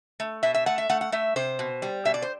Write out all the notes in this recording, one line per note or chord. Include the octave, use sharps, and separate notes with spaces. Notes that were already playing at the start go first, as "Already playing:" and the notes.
A3
B2 E5
E5
A3 F#5
E5
A3 F#5
F#5
A3 E5
C3 C5
B2
G3
B2 E5
D5
C5